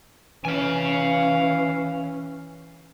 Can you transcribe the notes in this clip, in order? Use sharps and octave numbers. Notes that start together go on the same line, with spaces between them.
E3 C#4 F5 G#5